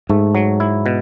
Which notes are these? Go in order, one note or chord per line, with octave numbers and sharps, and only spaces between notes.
G#2 A3
F#3
E4
B2